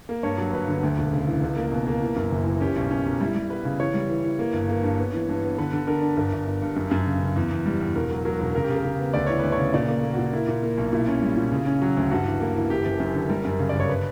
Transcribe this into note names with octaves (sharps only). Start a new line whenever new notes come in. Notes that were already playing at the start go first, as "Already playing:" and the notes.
A#3
G2 C#5
F#3
G1 B4
D3
D2
E1
C#3
E3
C#2
A#3
B2
A#3
E3
F#2
F#1
E3
C#4 G4
B1
C#4
B1
G3 E4
G3
B3 B4
C#3
E3 C#5
G3
E3
E3
A#3
G1
A#3
G2
B3
E3
G2
B3
D3 B4
D3
D4 A#4
D4
G1 A#4
G1
G1
G2
F#2
F#2
C#3
C#3
E2
E2
G3
E2
E1 A#4
F#3
F#3 A#4
E1
C#3 A#4
G4
C#3
A#4
C#3
B3
D2 D5
E3 C#5
D2 B4
C#5
C#3
A#2 D5
A#3
A#3
F#4
A#2
A#3 E4
A#2
A#3
B1
A#2 E4
C#4
G3
A#2
C#3
C#4
F#3
D2
G2 F#4
E3
A#3
E3
F#1 G4
F#1
F#2
D3
G3 A#4
F#2
C#3
D5
G1
C#5
B4